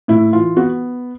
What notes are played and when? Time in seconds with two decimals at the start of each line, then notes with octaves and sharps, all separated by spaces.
0.08 A2 E4
0.33 E3 F4
0.56 B3 F#4